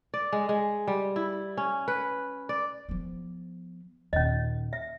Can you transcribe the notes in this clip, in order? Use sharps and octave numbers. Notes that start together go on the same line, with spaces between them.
D5
G#3
G#3
G3
E4
C#4
B4
D5
F3 B3
D#2 A#2 C#4 D#5
E5